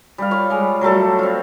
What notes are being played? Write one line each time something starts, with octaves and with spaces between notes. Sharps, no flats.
G3 F5
F4 C#5 F5
G3 G#3
F#3 G3 A3 A4
C4 F4